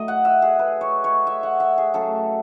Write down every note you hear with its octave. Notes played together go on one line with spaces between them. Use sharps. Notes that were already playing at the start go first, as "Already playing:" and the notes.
Already playing: A2 F#3 A3 D#5
F#5
E5
G#4
B4
C#5
C#5
E5
F#5
E5
G#4
C#3 F#3 A3 A4